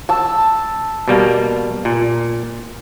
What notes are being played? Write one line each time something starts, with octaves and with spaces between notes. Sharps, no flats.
A5 E6
B2 G3 A#3
A#2